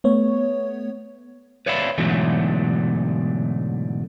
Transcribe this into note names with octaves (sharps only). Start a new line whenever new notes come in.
A3 B3 C#5
B4 C#5 D5 E5 F5 B5
G#2 B2 D3 E3 F#3 A3